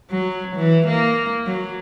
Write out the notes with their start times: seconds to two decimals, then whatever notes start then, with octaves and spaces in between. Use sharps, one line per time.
0.11 F#3
0.56 E3
0.88 A#3
1.47 F#3